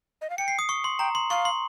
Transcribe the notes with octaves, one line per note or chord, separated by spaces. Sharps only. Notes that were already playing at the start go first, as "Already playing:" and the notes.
D#5
F5
G5 C#7
C7
D#6
C#6
C6
G5 A#5
C6
F5 C#6
C6